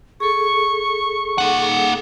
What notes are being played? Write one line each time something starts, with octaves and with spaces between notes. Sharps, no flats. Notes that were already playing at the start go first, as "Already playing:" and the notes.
G#4 A4 C#6
A#3 F#5